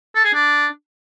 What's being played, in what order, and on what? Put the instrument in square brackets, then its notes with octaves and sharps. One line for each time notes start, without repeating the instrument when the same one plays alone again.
[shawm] A4
G#4
D4